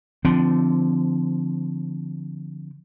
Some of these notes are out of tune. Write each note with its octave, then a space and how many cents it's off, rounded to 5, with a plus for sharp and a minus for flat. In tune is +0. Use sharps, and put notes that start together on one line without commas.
D3 +0 F3 -15 C4 -25